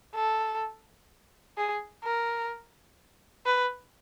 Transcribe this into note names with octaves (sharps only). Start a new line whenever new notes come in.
A4
G#4
A#4
B4